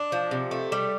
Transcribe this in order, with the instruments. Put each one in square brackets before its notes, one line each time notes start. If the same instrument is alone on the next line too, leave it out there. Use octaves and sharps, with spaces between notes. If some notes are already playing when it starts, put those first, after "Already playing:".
Already playing: [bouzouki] D4
F3
C3
A3
G3